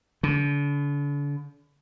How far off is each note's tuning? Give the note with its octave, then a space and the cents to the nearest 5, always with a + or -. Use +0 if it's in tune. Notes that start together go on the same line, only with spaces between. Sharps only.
D3 -40